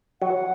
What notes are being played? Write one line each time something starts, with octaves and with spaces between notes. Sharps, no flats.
F#3 F#5